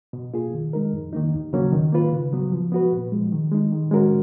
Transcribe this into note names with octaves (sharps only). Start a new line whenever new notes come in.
B2
A#3 F4 G#4
D#3
G#3 D#4 A#4
F2
D#3 A#3 D#4
D#2
C#3 F#3 A#3 C#4
D#3
A#3 F4 B4
C#3
F#3 B3
F3
B3 F#4 B4
A#2
F3 G#3
D#3
G#3 D#4
D#3
G#3 C#4 F#4 A#4